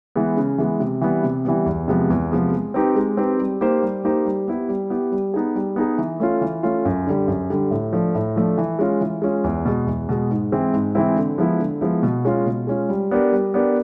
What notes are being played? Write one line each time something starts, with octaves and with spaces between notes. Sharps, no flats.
E3 G#3 B3
C#3
E3 G#3 B3
C3
E3 G3 B3
C3
E3 G3 B3
E2
C3 F3 G#3 B3
E2
C3 F3 G#3 B3
G#3
C4 D#4 G4 B4
G#3
C4 D#4 G4 B4
G3
A#3 D#4 G4 C5
G3
A#3 D#4 G4 C5
G3
B3 E4 G4
G3
B3 E4 G4
G3
B3 D#4 G#4
G3
B3 D#4 G#4
E3
A3 C#4 F4
E3
A3 C#4 F4
F#2
D3 G3
F#2
D3 G3
A2
F3 A3 D4
A2
F3 A3 D4
E3
G#3 C#4 F4
E3
G#3 C#4 F4
E2
B2 G#3
E2
B2 G#3
G#2
E3 G#3 C4 E4
G#2
E3 G#3 C4 E4
D3
F3 G#3 B3 E4
D3
F3 G#3 B3 E4
B2
G#3 C#4 F4
B2
G#3 C#4 F4
G3
B3 D4 G4 A#4
G3
B3 D4 G4 A#4